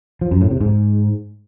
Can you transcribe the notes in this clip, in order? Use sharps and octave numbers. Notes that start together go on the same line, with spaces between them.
F3
F#2
A2
C3
G#2